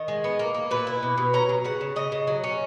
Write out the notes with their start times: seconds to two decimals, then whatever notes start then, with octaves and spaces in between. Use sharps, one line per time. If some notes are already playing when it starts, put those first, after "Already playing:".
Already playing: D#3 D#5
0.08 G#3
0.24 B3
0.39 A#3
0.54 A#3
0.71 A#2 B4
0.87 E4
1.03 B2
1.17 B2
1.33 C#4 A#5
1.49 F#3
1.64 C#3 F#5
1.81 C#3
1.96 C#3 D#5
2.12 C#3
2.27 F#3
2.44 C#4